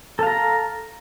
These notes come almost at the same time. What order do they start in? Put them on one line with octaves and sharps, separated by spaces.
A4 F5 A#5